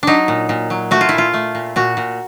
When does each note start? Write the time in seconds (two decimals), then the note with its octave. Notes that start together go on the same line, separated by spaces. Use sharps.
0.03 F#3 D4 D#4
0.28 A#2
0.49 A#2
0.70 F#3
0.91 A3 F#4
1.01 F4
1.09 A#2 E4
1.18 F4
1.34 A3
1.55 A#2
1.76 A#2 F#4
1.97 A#2